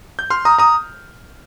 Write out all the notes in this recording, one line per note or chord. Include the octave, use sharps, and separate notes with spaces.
G6
C6 F6
A#5 D#6
A#5 D#6